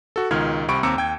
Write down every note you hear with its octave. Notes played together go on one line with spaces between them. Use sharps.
F#4 A4
C#2 B2 D#3 F4 F6 G#6
C2 C3 B5 C#6 D7
D#2 C4 A#5 D6 E6 C#7
D#2 G5 G#6